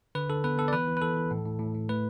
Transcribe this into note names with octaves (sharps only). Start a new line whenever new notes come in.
D3 B4
D3 A4
B3 B4
B3 A4
D5
E3 B4
E3
B4
E3 A4
E3
A2
A2
A2
A2
A3 B4